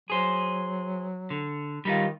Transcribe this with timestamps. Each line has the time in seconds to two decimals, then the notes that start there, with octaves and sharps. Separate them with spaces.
0.10 F#3 G#4 C5
1.30 D3
1.85 D#3 G3 D#4 F4